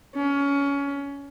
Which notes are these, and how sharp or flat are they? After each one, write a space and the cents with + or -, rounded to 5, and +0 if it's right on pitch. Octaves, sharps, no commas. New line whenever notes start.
C#4 +20